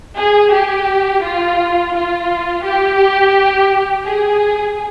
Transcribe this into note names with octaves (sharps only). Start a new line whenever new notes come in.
G#4
G4
F4
F4
G4
G#4